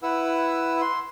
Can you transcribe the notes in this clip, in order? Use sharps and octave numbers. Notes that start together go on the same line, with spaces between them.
E4 B4 F#5 E6
C6